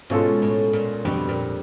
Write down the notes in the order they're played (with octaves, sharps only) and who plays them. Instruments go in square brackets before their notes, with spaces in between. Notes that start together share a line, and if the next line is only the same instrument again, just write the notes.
[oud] G#2 [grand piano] B2 G#3 C#4 F4 A4
[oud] A2
A#2
[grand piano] F2 D3 G3 [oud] B2
[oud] A#2